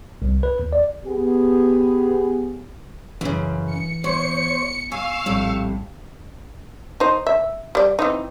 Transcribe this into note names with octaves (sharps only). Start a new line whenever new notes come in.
C2
B4
D#2
D5
B3 G4 G#4
F#2 C#3 E3
C#7
E2 C5 C#5 C#6 C#7
F5 G#5 C#6 E6
A#1 A2 C3 G3
D#4 C5
E5
G3 D5
E3 C4 D#4